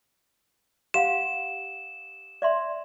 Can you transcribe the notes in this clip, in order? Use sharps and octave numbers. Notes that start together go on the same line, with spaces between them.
G4 F5 F#5 E7
D5 E5 C6